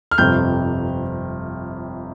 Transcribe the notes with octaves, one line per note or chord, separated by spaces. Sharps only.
F6
G1 F2 C3 G6